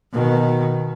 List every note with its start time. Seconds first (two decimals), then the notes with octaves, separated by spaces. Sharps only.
0.13 B2 D#3